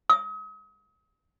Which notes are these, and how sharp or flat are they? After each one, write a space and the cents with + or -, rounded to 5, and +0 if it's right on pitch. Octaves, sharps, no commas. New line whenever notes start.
D#6 +40